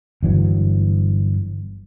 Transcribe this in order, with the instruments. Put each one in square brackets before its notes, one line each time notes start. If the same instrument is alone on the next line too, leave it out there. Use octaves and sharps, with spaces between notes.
[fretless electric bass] G1 E3 F#3